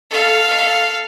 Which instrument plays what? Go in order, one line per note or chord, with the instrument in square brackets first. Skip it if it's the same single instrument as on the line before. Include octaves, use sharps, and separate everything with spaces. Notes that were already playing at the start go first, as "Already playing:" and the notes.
[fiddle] A4 F5